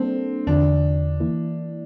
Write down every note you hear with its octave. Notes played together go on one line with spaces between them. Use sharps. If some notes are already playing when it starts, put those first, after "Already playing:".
Already playing: G3 A#3 C4 D4 A4
E2 D3 F3 D4
E3 A#3 E4